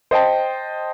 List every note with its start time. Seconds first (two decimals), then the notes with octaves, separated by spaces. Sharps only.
0.11 C5 D#5 G5 A5